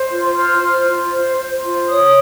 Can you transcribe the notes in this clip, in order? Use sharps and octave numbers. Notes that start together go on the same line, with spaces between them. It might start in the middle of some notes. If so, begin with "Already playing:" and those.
Already playing: C5
F4
C5 F6
F4
F4
C5
C5
F4
C#5 D#6